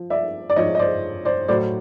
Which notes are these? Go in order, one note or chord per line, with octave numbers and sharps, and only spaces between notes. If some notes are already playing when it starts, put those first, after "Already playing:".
Already playing: F3
D5 E5
D5
G#2 F3 C#5 D#5
D#5
C5 D5
C5 D5
A2 F#3 C5 D5